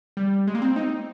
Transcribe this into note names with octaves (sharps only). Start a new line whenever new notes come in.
G3
G#3
A#3
C4
D#4